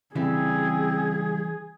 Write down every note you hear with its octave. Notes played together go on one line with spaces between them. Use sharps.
C#3 E3 G3 C4 G#4